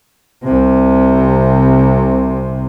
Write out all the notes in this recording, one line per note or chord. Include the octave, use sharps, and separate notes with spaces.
C2 C3